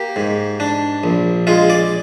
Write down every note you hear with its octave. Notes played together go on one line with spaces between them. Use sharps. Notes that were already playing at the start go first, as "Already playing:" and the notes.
Already playing: A#3 G4
G#2
D4
A#1
G#3 F4
D5